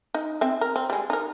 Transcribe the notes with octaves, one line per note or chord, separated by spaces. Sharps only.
D#4
C4 E5
A#4
C4
G3 G#3
D#4 A#4